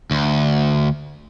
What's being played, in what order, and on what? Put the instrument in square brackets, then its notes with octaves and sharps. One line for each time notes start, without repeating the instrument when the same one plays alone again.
[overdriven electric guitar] D2